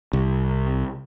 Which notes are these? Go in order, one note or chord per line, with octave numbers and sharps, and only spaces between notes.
C2